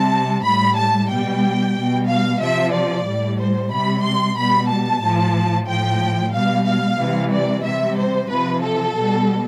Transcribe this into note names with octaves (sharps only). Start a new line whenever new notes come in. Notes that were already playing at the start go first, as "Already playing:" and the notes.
Already playing: C3 G3 A5
A2 G3 B5
A5
B2 G3 G5
B2 G3
F5
C3 F3 E5
D5
A2 G3
C5
C3 G3 B5
C6
B2 G3 B5
A5
A2 F3
A2 F3 G5
B2 G3 F5
F5
C3 E3 G3
D5
C3 G3 E5
C5
C3 F3 B4
A4
B2 G3